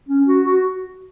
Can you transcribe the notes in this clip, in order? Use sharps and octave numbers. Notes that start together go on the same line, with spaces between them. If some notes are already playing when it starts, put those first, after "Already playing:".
C#4
F#4
F#4